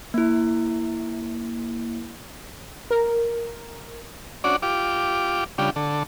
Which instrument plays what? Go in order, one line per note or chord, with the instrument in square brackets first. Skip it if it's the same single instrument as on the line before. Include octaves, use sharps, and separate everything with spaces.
[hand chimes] A#3 E4
[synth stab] A#4
[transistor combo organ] C#4 D4 F#4 D5
F4 G4 D6
C#3 G3 D4 F4 G4
D3 A4